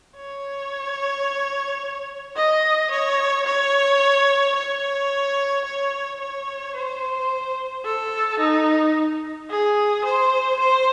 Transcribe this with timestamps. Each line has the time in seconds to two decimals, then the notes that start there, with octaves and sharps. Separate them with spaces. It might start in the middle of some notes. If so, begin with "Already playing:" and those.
0.16 C#5
2.36 D#5
2.91 C#5
3.46 C#5
4.55 C#5
5.65 C#5
6.20 C#5
6.75 C5
7.85 A4
8.40 D#4
9.50 G#4
10.05 C5
10.60 C5